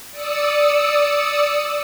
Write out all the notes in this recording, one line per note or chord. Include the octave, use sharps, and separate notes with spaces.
D5 D#6 E6 C#7